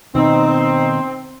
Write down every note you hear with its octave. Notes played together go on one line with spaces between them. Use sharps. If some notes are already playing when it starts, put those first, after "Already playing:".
B2 D#3 C4 D#4